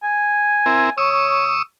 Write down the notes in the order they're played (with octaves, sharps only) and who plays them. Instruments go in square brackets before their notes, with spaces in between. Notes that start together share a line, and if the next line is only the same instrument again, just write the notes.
[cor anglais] G#5
[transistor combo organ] C4 E4 A#4
[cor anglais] C#5 [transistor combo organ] C#6 D#6 E6